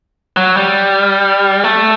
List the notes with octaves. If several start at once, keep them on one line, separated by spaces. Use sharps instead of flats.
F#3
G3
A3